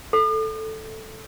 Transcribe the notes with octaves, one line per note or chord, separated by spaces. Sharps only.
A4